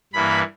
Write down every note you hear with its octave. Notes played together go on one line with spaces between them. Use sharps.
G2 E3 A#3 B5